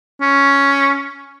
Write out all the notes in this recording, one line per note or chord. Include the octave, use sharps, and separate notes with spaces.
C#4